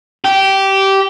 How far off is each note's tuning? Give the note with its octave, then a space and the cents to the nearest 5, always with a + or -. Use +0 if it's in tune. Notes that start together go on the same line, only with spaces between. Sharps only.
G4 -15